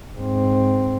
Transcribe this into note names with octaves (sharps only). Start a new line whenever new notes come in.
G#2 C4